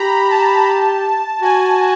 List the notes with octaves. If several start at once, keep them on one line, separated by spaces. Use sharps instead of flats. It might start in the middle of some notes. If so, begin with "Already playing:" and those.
Already playing: G4 A#5 B5
A5
F#4 G#5